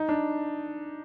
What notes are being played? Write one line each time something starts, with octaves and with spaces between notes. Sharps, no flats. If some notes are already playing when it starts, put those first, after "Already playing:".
Already playing: D#4
D4